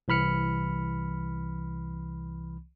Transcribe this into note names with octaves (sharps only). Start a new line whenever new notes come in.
C2 E3 B5 F6 C#7